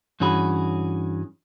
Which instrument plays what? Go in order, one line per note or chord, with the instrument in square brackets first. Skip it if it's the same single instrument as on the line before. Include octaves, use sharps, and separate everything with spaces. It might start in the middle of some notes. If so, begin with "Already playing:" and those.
[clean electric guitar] G2 E3 C#4 F#4 G#4 B5